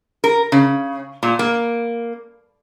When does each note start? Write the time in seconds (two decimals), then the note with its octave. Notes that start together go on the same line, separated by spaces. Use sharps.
0.24 A#4
0.52 C#3
1.23 A#2
1.39 A#3